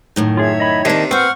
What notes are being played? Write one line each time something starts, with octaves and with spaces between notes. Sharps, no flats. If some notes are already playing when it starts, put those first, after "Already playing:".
F#2 A2 D#3
F4 G#4 C#5 E5 G#6
D#5 B5
C3 D#3 A#3 D4 D#5 A5
A#3 C4 F#4 B4 F#5 C#6 F6 G6